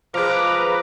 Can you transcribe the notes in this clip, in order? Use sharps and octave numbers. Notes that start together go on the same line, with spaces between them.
F3 G#3 F4 B4 A#5 D6